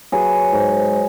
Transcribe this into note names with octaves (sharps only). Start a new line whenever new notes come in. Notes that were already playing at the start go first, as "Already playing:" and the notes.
F#3 G#4 B4
G#2